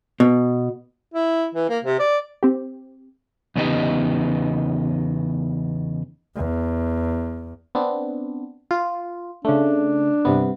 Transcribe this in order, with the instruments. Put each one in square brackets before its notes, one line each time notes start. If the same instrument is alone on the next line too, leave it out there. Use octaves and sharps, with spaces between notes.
[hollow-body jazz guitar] B2
[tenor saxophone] E4
E3
A#3
C3
D5
[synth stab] C4 G4
[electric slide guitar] E2 C#3 B3 D#4 G4 D#5
[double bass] E2
[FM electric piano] B3 C4 D4
F4
[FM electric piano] C#3 A3 [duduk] D4
[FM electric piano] G2 C3 B3